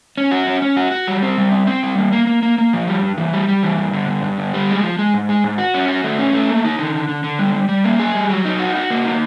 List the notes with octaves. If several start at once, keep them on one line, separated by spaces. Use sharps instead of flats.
C#4
F#4
C#4
C#4
F#4
F#4
G3
C4
G3
C4
C4
G3
A#3
A#3
A#3
A#3
A#3
F3
G3
G2
E3
G3
G3
E3
G2
D3
G2
G2
D3
G3
G#3
F3
G#3
G#2
G#3
G#2
F#4
C#4
F#4
A3
C#4
A3
A#3
D#4
D3
D3
D3
D3
G3
G3
G3
A#3
G#4
G3
F#3
D#4
F#4
F#4
A#3
D#4